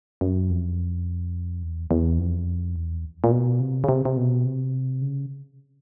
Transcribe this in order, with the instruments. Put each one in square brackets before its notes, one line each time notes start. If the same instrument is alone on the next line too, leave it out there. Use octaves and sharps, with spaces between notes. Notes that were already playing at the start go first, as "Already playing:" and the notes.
[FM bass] F#2
F2
E2
E2
F2
E2
A#2
B2
C3
C#3
C3
C3
B2
C3
C#3